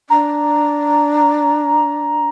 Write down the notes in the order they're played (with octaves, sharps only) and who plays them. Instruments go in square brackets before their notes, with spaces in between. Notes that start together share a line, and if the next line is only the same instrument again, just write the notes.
[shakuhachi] D4 [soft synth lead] A#5